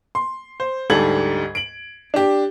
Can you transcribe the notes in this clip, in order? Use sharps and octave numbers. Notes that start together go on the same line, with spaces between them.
C6
C5
D2 G#2 G3 A4 G#6 F#7
D7 F#7
D4 G4